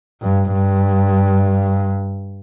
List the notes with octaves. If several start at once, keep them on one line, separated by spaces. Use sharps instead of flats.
G2
G2